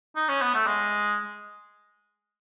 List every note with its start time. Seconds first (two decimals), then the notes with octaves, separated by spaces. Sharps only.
0.16 D#4
0.29 C#4
0.42 B3
0.54 A3
0.67 G#3